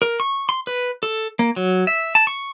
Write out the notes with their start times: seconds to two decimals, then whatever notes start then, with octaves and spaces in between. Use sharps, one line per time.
0.02 A#4
0.20 C#6
0.49 C6
0.67 B4
1.03 A4
1.39 A#3
1.56 F#3
1.87 E5
2.15 A5
2.27 C#6